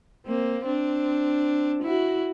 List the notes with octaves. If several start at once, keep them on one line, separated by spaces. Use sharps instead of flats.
A#3 C4
C4 D4
E4 F#4